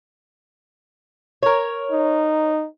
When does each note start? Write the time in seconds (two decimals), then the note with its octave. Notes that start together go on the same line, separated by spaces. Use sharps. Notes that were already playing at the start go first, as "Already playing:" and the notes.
1.43 A#4 C#5
1.92 D#4